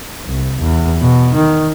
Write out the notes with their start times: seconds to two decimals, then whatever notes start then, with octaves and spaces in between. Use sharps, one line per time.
0.25 C2
0.60 E2
1.00 B2
1.35 D#3